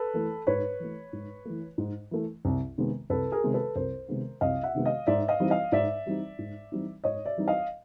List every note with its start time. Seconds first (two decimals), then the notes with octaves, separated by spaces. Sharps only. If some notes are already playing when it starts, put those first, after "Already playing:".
Already playing: A4 B4
0.14 E3 A3
0.47 G#2 B4 C#5
0.80 E3 A3
1.13 G#2
1.45 E3 A3
1.78 G#2
2.11 E3 A3
2.45 C2
2.78 C3 D#3 G#3 B3
3.10 C2 A4 B4
3.32 G#4 A#4
3.43 C3 D#3 G#3 B3
3.54 A4 B4
3.76 C2 A#4 C5
4.08 C3 D#3 G#3 B3
4.41 C2 D#5 F5
4.63 E5 F#5
4.74 C3 D#3 G#3 B3
4.86 D#5 F5
5.07 G#2 D5 E5
5.28 D#5 F5
5.40 E3 G3 C4 D#4
5.50 D#5 F5
5.72 G#2 D5 E5
6.06 E3 G3 C4 D#4
6.39 G#2
6.72 E3 G3 C4 D#4
7.04 G#2 C#5 D#5
7.26 D5 E5
7.37 E3 G3 C4 D#4
7.48 D#5 F5